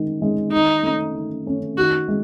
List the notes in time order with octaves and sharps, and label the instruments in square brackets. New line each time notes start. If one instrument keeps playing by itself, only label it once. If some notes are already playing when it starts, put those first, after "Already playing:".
Already playing: [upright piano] D#3 G#3 D#4
G#3 D#4
[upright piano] D#3 [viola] D#4
[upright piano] A3 C#4
D#3
A3 C#4
[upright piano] D#3 [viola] F#4
[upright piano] G#3